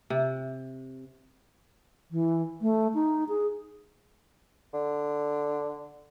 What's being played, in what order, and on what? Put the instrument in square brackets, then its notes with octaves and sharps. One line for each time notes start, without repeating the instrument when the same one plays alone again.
[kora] C3
[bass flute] E3
A3
D#4
G#4
[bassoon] D3